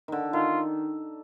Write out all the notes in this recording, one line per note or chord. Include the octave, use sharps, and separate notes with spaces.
D3 D#3
D#3 F4